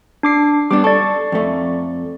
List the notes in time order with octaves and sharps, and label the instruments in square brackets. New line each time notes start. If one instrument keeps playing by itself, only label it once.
[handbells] D4 D6 C7
[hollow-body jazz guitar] G3 B3 D4 [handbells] D6
[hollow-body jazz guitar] A4 [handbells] D5 C#6
[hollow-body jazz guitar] F2 A3